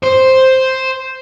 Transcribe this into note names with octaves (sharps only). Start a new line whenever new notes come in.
C5